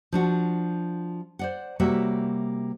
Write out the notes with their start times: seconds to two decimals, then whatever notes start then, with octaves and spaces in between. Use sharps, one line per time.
0.12 F3 D4 F#4
1.39 C5 D5 F#5
1.80 C3 G3 A#3 F#4 C#5 E5